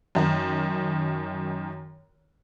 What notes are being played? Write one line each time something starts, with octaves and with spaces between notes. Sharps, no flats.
F#2 D#3